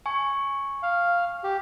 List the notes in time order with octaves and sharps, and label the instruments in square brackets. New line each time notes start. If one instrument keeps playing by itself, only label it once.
[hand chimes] G#5 C#6
[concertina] F5
G4